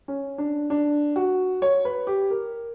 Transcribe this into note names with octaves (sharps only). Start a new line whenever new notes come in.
C#4
D4
D4
F#4
C#5
B4
G4
A#4